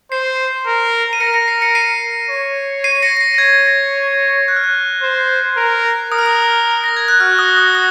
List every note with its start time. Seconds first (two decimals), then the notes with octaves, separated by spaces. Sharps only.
0.12 C5 C7
0.66 A#4
1.13 D#7
1.20 A#4 A#6 C#7
1.34 A#6 C#7
1.48 C7
1.61 A#6 C#7
1.75 C7 D#7
2.29 C#5
2.84 C7 D#7
3.02 A#6 C#7
3.17 A#6
3.21 C7
3.34 A#6
3.38 C#5 G#6
3.66 A#6
4.48 F#6
4.56 F6
4.64 F#6
5.02 C5
5.57 A#4
6.12 A#4 D#6
6.19 F6
6.26 D#6
6.84 A#6
6.97 G#6
7.08 F#6
7.20 F#4 F6
7.39 D#6
7.57 D#6
7.75 D#6